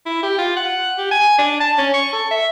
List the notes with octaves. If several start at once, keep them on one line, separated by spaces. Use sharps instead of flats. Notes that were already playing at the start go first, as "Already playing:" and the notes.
E4
G4
F4
F#5
G4
G#5
D4
A5
C#4
C#6
A4
E5